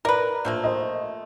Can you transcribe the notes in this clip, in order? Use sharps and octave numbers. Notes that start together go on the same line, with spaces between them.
A#4 B4 D5
A#1 F3 A3 A#3
C5 D#5